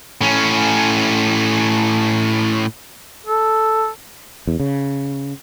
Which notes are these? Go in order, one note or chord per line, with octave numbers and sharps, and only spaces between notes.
A2 C#4
A4
E2
C#3